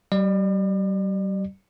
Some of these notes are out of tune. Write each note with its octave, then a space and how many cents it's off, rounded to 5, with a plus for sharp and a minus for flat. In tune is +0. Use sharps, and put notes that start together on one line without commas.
G3 -35 D5 +40